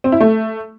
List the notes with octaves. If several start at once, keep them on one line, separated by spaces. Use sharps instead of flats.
C4
E4
A3